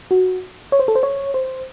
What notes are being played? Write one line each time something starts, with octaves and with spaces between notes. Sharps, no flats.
F#4
C#5
C5
A4
C5
C#5
C5